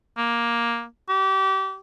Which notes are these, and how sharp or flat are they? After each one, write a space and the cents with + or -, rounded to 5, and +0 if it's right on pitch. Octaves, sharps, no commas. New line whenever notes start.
A#3 +10
G4 -30